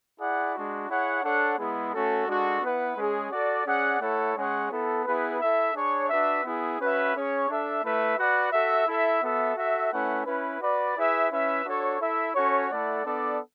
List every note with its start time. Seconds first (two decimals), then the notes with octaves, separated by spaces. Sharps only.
0.19 E4 G#4 D5 F#5
0.55 G#3 D4 F#4
0.89 E4 G#4 C#5 F#5
1.23 D4 A4 C#5 F#5
1.58 G#3 B3 E4 G#4
1.93 A3 C#4 F#4 A4
2.28 G#3 D4 F#4 A4
2.62 B3 E4 B4 F#5
2.97 G#3 C#4 G#4
3.31 F#4 A4 D5
3.67 C#4 G#4 D5 F#5
4.01 A3 E4 A4 C#5 F#5
4.37 G#3 C#4 G#4 C#5 F#5
4.71 B3 E4 A4
5.05 B3 E4 G#4 B4
5.40 E4 A4 E5
5.74 D4 G#4 C#5
6.09 D4 F#4 B4 E5
6.44 B3 E4 G#4
6.80 C#4 F#4 B4 E5
7.14 C#4 G#4 C#5
7.49 D4 A4 E5
7.84 A3 E4 B4 E5
8.18 F#4 B4 D5 F#5
8.52 F#4 A4 E5
8.87 E4 A4 E5
9.22 B3 F#4 A4 E5
9.57 F#4 A4 E5
9.92 A3 C#4 E4 B4 F#5
10.26 C#4 E4 B4
10.61 F#4 B4 D5
10.96 E4 G#4 B4 E5
11.31 C#4 E4 B4 E5
11.65 D4 F#4 A4 C#5
12.00 E4 A4 E5
12.34 C#4 F#4 A4 C#5
12.69 A3 E4 A4 D5 F#5
13.05 B3 D4 A4 D5